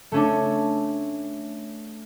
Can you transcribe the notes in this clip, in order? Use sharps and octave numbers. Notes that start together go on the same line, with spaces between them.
A3 C#4 D4